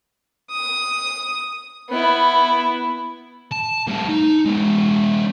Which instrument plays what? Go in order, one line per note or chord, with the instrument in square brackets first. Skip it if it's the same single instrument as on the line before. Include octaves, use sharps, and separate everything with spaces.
[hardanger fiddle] D#6
B3 E4
[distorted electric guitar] A5
A2 G3
D#4
G#3 B3